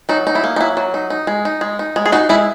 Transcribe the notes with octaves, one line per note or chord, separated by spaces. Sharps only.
F#3 D#4
D#4
E4
A#3
D#4
F#3 E4
F#3
D#4
D#4
G#3
D#4
G#3
D#4
G#3
G#4
D#4 F#4
G#3 E4